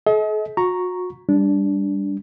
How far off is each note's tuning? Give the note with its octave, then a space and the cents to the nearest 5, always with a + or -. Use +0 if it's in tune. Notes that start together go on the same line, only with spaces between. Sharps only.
A4 -45 D#5 +40
F#4 -35 A#5 +0 C#6 +0
G3 +20 D4 -15